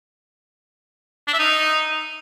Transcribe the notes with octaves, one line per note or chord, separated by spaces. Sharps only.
D4
E5
D#4